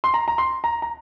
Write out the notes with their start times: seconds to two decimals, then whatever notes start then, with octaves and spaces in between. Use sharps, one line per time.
0.04 C6
0.14 A#5
0.28 A#5
0.38 C6
0.64 A#5
0.82 A#5